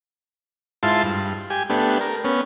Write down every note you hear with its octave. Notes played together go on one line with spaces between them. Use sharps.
G#2 E4 F4 A5 C6
G2
G4 G#5
A3 B3 D4 G4
A#4
B3 C#4